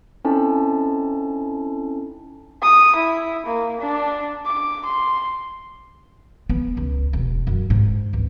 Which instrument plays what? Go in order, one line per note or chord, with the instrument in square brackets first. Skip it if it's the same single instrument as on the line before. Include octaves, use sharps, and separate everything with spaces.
[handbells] C4 C#4 D#4 E4 A4 A5
[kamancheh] D#6
E4
A#3
D4
D6
C6
[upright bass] B3
C#2
E1
F#2
G#2
C#2